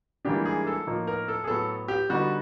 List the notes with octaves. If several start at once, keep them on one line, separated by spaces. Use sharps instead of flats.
G#2 E3 G3 A#3 D4 G4
G#4
A4
A2 F3 A#3 D#4
A#4
A4
G#4
A2 F#3 B3 A4
G4
D3 G3 B3 D#4 F#4